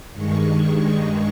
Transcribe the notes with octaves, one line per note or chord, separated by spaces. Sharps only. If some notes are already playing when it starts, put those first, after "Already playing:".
G2 D#3 G#3 C#6